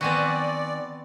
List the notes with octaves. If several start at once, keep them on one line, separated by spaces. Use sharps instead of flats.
D#3 B3 C4 F#4 B4 D5 G#5